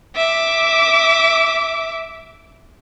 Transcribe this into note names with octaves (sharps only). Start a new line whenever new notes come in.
E5 D6